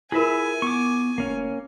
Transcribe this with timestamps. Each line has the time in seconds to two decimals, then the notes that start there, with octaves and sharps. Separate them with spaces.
0.12 E4 F4 G#4 A#4 B4 E5 G#5
0.62 B3 C#6 D6
1.18 F1 A#3 C#4